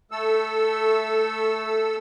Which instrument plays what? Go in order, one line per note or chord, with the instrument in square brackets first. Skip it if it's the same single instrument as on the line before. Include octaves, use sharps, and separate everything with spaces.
[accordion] A3 A4 E6